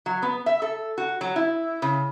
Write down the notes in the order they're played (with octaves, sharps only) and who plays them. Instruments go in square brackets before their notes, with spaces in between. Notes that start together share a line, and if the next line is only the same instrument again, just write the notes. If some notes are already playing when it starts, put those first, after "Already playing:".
[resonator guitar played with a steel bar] F#3
B3
E5
A4
F#4
F#3
E4
C#3